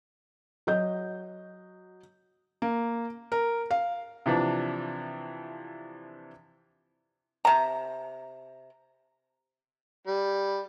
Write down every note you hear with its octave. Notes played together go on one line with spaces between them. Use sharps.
F#3 F#4 D#5 G6
A#3
A#4
F5
C3 E3 F3 D4
C3 A#5
G3